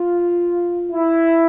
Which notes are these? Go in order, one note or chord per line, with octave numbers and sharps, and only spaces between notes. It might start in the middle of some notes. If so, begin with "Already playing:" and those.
Already playing: F4
E4